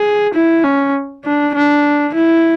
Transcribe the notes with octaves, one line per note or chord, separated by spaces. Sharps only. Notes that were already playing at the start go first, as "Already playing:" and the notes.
Already playing: G#4
E4
C#4
D4
D4
E4